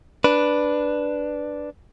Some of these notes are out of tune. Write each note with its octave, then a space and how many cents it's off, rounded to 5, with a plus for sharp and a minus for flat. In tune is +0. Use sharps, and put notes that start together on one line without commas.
D4 +0 B4 +0